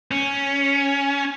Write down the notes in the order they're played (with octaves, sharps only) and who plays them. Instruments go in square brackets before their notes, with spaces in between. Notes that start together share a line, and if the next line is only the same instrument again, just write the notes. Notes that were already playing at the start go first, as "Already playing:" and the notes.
[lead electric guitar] C#4